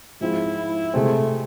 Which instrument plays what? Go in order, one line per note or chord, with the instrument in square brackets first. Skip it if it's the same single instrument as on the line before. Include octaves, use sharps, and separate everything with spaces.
[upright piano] G#2 F3 G#3 C4 F4 [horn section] E4
[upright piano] C3 G#3 C4 [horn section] A3